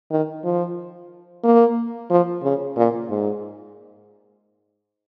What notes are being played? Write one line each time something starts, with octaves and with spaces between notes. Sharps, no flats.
D#3
F3
A#3
F3
C#3
A#2
G#2